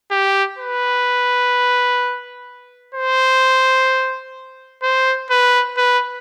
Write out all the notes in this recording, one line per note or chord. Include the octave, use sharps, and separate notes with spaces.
G4
B4
C5
C5
B4
B4